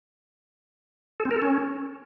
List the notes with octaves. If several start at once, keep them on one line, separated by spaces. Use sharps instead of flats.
A4
C4
A#4
A4
C#4